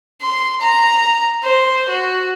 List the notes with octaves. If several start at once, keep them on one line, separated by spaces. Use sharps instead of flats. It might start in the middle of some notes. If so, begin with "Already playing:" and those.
C6
A#5
C5
F#4